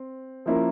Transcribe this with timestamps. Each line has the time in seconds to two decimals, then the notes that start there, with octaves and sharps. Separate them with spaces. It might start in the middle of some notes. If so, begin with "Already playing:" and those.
Already playing: C4
0.46 F3 A#3 C#4 E4 A#4